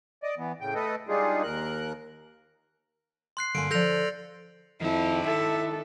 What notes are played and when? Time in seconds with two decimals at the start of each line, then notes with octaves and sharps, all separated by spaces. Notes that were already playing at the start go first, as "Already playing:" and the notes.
0.23 D5 D#5
0.38 E3 B3
0.61 A2 C#3 G5
0.75 A3 A4 B4 D#5
1.08 G3 G#3 D4 D#4 F4 G#4
1.43 D#2 A#4 F#6
3.37 C6 F#6 C7
3.55 G2 D3 A#3 G#5 C6 D7
3.71 D3 F3 A4 D5 G6 A#6 F7
4.81 F2 D#3 E4 A5
5.26 E4 A4 E5